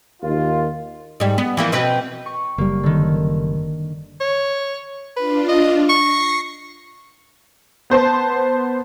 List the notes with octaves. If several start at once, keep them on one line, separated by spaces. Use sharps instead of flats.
D#2 F4
G#2 G3
B3
E3 F3 A#3
B2 C4 B4
C#6
F#1 G3 A#3
D3 D#3
C#5
D4 F4 B4
D#5
C#6 A#6 C7
B3 C5 A5 C6